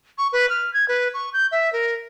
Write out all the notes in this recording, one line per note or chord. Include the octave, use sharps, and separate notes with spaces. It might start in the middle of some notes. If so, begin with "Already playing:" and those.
C#6
B4
F6
G#6
B4
C#6
G6
E5
A#4